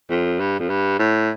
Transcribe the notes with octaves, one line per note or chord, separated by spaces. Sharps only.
F2
G2
F2
G2
A2